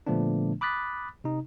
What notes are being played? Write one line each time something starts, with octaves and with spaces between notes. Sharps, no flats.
A#2 D3 F3 A3 B3 D4
B5 D6 D#6 F#6 A6 B6
C3 D#4